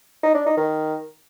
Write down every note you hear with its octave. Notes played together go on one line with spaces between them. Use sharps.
D#4
D4
D#4
D#3